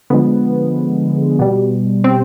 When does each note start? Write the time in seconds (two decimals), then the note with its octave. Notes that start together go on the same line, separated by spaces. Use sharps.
0.10 D3 F3 G#3 B3
1.39 B2 G3
2.04 C4